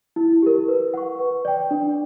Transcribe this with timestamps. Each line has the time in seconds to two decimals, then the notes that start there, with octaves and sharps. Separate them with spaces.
0.16 E4
0.42 G4 A#4
0.68 B4
0.94 F#5 C#6
1.19 B4
1.45 D5 G5
1.71 D4